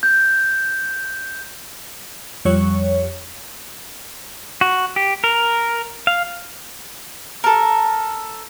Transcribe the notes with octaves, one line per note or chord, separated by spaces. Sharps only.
G6
F2 F3 G3 C#5
F#4
G4
A#4
F5
A4 A#4